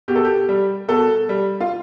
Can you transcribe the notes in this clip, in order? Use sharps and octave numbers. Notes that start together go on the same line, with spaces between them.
B2 G4
A4
G4
G3
B2 A4
G3
F4